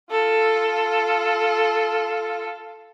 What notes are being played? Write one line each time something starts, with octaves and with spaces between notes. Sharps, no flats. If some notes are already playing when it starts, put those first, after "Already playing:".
F4 A4